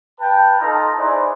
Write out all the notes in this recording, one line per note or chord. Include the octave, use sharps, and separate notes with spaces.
B4 G5 A5
D#4 F4 A4 A#5
D#4 E4 G#4 B4 C5 D5